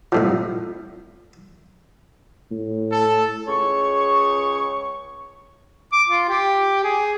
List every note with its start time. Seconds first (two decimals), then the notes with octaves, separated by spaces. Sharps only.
0.12 C2 A2 F3
2.51 A2
2.91 A4
3.47 C#2 G#4 C#5 C#6
5.93 D6
6.08 F4
6.29 G4
6.84 G#4